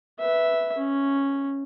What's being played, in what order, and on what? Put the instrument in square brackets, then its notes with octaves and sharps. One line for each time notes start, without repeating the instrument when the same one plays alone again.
[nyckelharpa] B4 E5
C#4